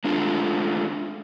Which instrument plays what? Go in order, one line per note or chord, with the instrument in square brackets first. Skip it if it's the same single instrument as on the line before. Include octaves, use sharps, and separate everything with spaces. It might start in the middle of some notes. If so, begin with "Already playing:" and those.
[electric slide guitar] G#3 A3 D4 F4